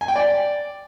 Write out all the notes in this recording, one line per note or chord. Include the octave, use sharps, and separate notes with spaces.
G#5
G5
D5